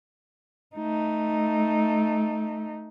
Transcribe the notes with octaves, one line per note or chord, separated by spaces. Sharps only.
A3 D#4